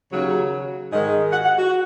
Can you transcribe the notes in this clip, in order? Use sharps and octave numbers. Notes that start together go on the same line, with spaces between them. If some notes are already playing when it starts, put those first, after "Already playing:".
D#2 C#3 F#3 C#5
G#2 D#3 G#3 D#5
F#5
F#5
F#4